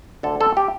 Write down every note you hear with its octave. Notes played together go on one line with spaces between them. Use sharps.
D2 D3 A4
A4
G4